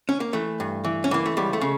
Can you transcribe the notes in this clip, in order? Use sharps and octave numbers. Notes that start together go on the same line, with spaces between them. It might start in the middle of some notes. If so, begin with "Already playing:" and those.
C#4
A#3
E3 A3
G2
E3
C#4
E3 A#3
A3
C#2 G3
A3
C#3